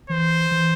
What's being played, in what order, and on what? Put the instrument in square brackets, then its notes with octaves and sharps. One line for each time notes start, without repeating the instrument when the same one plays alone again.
[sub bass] E3 [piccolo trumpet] C5
[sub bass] E3